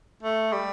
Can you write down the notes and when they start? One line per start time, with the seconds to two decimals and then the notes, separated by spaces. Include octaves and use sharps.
0.23 A3
0.53 G3